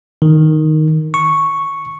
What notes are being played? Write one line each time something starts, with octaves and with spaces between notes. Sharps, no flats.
D#3
C#6